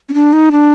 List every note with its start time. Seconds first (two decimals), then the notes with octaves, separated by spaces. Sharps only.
0.09 C#4
0.14 D4
0.33 D#4
0.52 D4